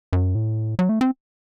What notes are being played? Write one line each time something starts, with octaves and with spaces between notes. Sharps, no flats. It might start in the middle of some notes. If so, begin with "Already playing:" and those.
F#2
A2
F#3
A3
C4